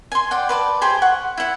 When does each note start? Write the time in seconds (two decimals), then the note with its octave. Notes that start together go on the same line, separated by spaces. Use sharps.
0.12 G#5 C6
0.31 D5 F#5 G5
0.49 B4 D5 A5
0.81 G4 G#4 C5 G#5
1.02 F#5 C#6
1.37 E4 F#5